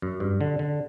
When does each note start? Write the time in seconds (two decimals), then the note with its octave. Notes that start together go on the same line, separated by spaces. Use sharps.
0.02 F#2
0.20 G2
0.41 D3
0.59 D3